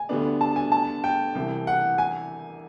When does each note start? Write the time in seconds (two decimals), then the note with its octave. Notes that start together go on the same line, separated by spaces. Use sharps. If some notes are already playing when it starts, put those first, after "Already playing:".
Already playing: G#5
0.09 D2 D3 G3 B3 D4
0.41 A5
0.56 G#5
0.72 A5
1.04 G5
1.35 C2 C3 E3
1.67 F#5
1.98 G#5